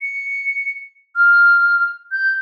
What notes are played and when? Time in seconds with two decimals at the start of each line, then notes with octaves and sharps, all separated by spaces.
0.01 C#7
1.15 F6
2.11 G6